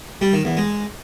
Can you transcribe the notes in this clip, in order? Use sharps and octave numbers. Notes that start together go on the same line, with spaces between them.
G3
D#3
E2
G#3